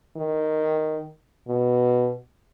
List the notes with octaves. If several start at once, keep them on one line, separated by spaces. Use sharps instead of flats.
D#3
B2